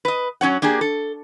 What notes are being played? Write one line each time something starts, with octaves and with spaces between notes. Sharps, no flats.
B4 D#5
F#3 C#4 C#5 F#5
A#3 D4 G4 G#4
A4